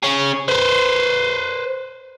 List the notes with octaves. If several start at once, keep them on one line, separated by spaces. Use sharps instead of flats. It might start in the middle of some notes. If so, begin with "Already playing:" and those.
C#4 G#4
B4 C5